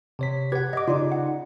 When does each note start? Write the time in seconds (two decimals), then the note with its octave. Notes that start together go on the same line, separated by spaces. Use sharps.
0.19 C3 C#5 B6
0.52 G4 B4 F#5 G#6
0.73 D#5 D6
0.88 C#3 D#4 F4 D5
1.12 F#5